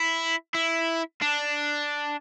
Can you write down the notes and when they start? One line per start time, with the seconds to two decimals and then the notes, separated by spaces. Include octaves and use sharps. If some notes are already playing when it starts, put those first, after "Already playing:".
Already playing: E4
0.54 E4
1.22 D4